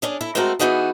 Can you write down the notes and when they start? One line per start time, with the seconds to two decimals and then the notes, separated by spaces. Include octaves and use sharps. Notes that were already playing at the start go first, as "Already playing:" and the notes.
0.02 C#4 D4 G#4
0.21 E4 A4
0.35 G#3 A3 C4 F#4 A4 A#4
0.59 E3 G#3 B3 D#4 F#4 G#4